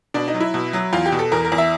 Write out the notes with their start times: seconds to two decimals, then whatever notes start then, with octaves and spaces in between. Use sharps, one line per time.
0.14 B2 D4
0.28 D#4
0.34 F#3
0.40 E4
0.54 B2
0.73 F#3
0.93 E2 F4
1.06 G4
1.12 B2
1.19 A4
1.32 E2 A#4
1.45 A#4
1.52 E2
1.58 E5